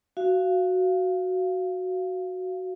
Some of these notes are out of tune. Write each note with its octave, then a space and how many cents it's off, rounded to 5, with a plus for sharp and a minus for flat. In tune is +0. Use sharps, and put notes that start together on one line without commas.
F#4 +0 F5 -15